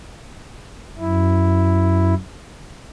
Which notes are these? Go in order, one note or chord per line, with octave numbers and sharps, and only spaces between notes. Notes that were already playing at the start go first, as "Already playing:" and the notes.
F#2 E4